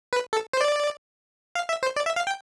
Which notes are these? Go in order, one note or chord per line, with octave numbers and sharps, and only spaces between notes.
B4
A4
C5
D5
F5
E5
C5
D5
E5
F5
G5